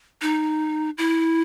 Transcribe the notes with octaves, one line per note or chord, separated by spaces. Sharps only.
D#4
E4